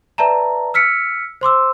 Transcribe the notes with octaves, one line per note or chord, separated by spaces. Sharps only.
B4 D5 E5 A5 A#5
E6 F6 B6 C#7
C5 C6 D6 E6